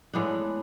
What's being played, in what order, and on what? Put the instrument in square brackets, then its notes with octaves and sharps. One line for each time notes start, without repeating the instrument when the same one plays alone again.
[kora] A2 G#3 B3 D4